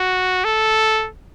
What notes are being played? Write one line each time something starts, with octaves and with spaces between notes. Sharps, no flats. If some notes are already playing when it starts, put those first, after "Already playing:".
Already playing: F#4
A4